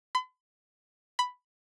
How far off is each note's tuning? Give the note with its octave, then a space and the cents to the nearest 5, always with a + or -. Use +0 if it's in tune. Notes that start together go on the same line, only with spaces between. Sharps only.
B5 +45
B5 +5